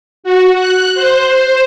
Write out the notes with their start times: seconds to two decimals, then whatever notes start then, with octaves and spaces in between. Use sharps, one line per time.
0.24 F#4
0.56 F#6
0.95 C5
1.29 C5